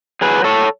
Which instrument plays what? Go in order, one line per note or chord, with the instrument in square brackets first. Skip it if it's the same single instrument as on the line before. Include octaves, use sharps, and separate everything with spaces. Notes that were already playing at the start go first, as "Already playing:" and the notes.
[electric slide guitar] F#3 G#4 B4
A4 C#5